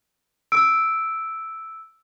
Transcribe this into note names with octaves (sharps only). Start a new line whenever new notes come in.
E6 D7